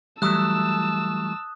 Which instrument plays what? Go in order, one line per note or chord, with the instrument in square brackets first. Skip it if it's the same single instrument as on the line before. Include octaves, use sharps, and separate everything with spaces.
[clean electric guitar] E3 F#3 A3 [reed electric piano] G3 [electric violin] A5 E6 [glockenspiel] D#6 F#6